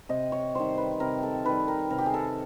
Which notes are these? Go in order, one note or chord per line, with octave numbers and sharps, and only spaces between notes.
C3 D#5
C#5
D#3 G3 C5
B4
C3 A#4
A4
D#3 G3 B4
A#4
C3 A#4
G4
G#4
A4